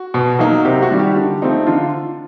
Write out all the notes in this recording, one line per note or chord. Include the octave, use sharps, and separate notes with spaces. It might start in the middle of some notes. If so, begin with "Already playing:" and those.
Already playing: F#4
B2
F#3 A#3 D#4
C3 G4
F#4
D#3 G3
G4
D3
F3 A3 C4 D#4
D3 F4